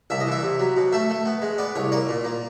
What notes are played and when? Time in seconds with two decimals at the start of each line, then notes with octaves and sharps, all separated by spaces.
0.10 C2 E5
0.20 D#5
0.27 E3 E5
0.43 C3
0.60 F#3
0.77 B2
0.92 A3 E5
1.10 A3
1.26 B3
1.42 G#3
1.58 B3 D5
1.75 C2 C#5
1.92 A#3 D5
2.09 A#2
2.25 A#3